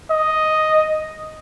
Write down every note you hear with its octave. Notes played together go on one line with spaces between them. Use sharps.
D#5